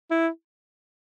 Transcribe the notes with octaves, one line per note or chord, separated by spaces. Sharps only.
E4